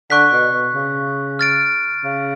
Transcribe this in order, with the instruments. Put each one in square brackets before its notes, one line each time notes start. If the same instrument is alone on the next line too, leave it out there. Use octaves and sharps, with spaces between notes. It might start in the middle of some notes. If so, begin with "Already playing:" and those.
[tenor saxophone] D3 [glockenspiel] C#6 F#6 B6
[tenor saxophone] B2
B2
C#3
[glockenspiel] F6 A6 D7
[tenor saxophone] C#3